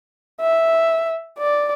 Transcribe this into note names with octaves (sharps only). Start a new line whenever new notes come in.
E5
D5